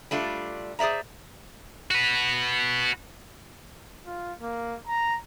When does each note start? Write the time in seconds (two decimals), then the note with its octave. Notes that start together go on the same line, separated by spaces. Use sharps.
0.11 G3 A3 D4 F4
0.79 G#4 C5 D5 E5 A#5
1.91 F#4 B4
4.05 F4
4.41 A#3
4.87 A#5